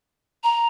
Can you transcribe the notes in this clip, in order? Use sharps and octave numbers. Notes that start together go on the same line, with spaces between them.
A#5